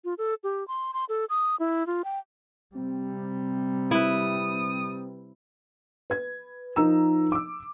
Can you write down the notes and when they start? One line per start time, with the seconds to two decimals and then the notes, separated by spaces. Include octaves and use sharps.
0.05 F4
0.18 A4
0.44 G4
0.68 C6
0.93 C6
1.09 A4
1.30 D#6
1.60 E4
1.87 F4
2.04 G5
2.75 C3 G3 C4
3.91 E4 B4 D#6
6.10 B4 G#6
6.76 F3 D#4 A#4 A#5 E6 E7
7.32 D6 E6